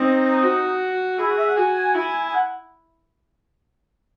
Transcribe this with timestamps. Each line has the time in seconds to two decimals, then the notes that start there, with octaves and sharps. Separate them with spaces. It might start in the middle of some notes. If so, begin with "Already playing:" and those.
Already playing: C4 D#4
0.42 F#4
1.18 E4 G#4
1.29 F#4
1.38 E5
1.48 F#5
1.56 F#4 G#5
1.76 G#5
1.95 E4 G#5
2.29 G#5
2.34 F#5